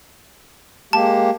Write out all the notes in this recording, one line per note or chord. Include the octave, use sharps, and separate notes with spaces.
G#3 A#3 G4 A5